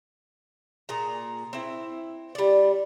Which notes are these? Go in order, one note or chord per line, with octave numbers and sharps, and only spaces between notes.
A#2 G#4 A#5
C4 E4
G3 D5